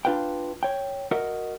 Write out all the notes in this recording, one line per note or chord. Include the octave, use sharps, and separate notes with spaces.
D4 F4 B4 F5 G5
C#5 G5
F#4 A#4 D#5 E5 F#5